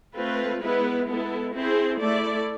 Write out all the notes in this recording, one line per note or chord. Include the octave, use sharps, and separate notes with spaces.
A3 C4 F4 B4
G#3 B3 E4 B4
G#3 B3 E4 A4
C4 E4 G#4 C5
A3 E4 A4 D5